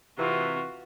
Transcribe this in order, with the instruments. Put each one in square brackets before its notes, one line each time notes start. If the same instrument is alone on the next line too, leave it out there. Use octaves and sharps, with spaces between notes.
[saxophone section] C3 E3 [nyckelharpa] F4 F#4